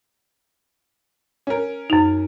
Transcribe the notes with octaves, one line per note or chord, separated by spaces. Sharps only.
C#4 A#4
F#2 D#4